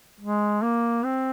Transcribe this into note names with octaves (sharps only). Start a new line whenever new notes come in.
G#3
A#3
C4